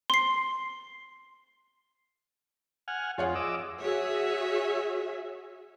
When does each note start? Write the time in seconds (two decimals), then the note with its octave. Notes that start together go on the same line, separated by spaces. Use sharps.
0.10 C6 C7
2.88 F#5 G#5 F6
3.18 F2 F4 G#4 C#5 F#5
3.35 D#5 D6 E6
3.80 F#4 G#4 C#5 E5